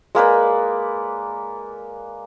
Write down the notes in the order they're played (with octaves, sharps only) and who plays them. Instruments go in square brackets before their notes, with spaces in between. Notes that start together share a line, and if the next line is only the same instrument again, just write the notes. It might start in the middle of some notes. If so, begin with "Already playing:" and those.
[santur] G#3 A#3 B4 D5